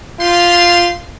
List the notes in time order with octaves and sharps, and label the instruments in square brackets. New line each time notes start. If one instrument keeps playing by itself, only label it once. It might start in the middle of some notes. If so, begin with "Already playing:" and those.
[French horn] F4 [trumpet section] G4 F5 C6